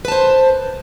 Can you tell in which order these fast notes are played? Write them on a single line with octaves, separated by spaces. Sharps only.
B4 A5 C5